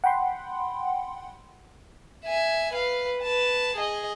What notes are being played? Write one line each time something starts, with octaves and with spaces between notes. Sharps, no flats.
F#5 G5 B5 C6
E5 G#5
B4 F5
B4 A5
G#4 D#5